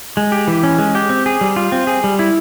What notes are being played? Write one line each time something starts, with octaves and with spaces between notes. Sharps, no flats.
G#3
G4
E3
C#4
G#3
G4
C4
G#4
G3
F4
C4
G#4
G3
E4